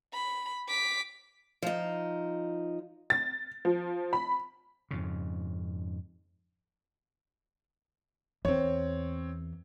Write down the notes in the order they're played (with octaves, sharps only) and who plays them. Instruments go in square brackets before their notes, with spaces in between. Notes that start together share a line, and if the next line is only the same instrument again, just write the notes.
[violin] B5
D6 B6
[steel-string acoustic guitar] F3 D#4
[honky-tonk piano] A6
F3
B5
[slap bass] F2 G#2 C#3
[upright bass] E2 [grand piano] C4 C#5